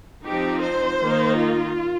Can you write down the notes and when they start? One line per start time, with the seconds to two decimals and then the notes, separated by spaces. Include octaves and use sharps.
0.24 F3 C4 D#4 G4
0.62 C5
1.01 D#3 A#3 D#4
1.38 F4